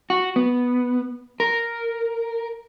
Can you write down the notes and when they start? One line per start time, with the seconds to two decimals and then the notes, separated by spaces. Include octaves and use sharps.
0.10 F#4
0.36 B3
1.40 A#4